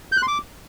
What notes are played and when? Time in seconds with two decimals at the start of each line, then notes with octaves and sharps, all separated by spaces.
0.12 G6
0.17 F#6
0.23 C6
0.28 D6